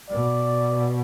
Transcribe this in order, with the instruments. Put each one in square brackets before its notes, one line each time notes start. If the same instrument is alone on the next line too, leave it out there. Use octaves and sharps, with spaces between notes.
[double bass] B2 [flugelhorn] D5